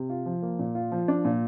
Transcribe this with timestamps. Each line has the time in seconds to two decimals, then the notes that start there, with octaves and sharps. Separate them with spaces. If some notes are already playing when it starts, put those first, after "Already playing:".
Already playing: C3
0.09 F4
0.26 F3
0.42 A#3
0.59 A#2
0.75 F4
0.92 F3
1.08 D4
1.25 A#2